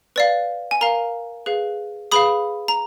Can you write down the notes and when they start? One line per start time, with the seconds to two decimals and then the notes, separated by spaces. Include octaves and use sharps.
0.16 B4 D5 F5
0.71 G#5
0.81 A#4 F5 A#5
1.46 G#4 B4 F5
2.12 G#4 B4 F5 B5 D#6
2.68 A#5